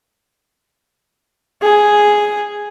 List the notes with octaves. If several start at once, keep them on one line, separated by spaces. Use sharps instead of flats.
G#4